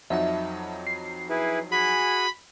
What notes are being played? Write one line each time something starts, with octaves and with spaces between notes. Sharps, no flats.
F2 F#3 D#4 E5 F#5 A5
C7
E4 G#4 B4
F#4 G#4 G#5 B5